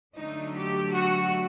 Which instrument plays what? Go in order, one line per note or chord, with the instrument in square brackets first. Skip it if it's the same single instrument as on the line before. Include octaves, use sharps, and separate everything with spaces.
[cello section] D3 F#3 A3 D#4
G4
F#4